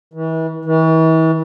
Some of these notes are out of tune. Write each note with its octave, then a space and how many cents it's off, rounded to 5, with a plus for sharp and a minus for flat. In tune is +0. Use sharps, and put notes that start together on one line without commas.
E3 -35
E3 -40